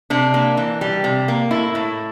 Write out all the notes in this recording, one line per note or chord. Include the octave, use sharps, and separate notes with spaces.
C3 D4
A#3
E3
G3
C3
A#3
A2 E4
A2